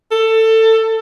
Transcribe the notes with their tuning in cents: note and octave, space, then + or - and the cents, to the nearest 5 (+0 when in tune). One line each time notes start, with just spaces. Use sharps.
A4 +20